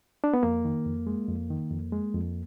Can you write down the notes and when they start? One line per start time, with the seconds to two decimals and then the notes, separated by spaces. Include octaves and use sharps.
0.24 D4
0.33 B3
0.43 F2 A#3
0.65 D#3
0.86 F2
1.07 G#3
1.28 F2
1.50 D#3
1.71 F2
1.92 G#3
2.14 F2